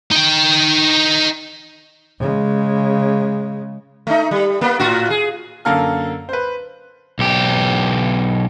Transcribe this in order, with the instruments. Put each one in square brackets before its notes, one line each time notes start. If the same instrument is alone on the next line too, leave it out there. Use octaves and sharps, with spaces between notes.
[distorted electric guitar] D#4 G5
[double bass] C#3 G#3
[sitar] A3 D#4
G3
A#3 B3
A2 F4 F#4
G#4
[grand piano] F#2 D3 A#3 A4 A#5 F6
B4 C5
[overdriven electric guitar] B1 G4